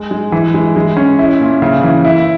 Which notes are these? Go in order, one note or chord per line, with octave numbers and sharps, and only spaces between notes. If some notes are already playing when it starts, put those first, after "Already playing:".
Already playing: G#3
G#3
E3
G#3
G#3
C#4
E4
A#2
C#3
E3
E4